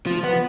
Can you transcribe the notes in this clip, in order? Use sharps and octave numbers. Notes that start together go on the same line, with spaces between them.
F3
B3